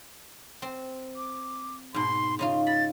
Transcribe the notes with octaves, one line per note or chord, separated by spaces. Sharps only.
C4
D6
G#2 B2 C6
C#3 D#4 F4 C6
B5 A6